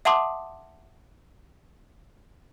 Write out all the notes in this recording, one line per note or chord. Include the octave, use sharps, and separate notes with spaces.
E5 F#5 A5 C6 D6 D#6